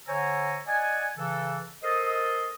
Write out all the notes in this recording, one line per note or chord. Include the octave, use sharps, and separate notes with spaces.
D3 C5 C#5 G#5 A#5 E6
D5 D#5 F#5 G#5
C#3 E3 A4
A4 A#4 C5 D#5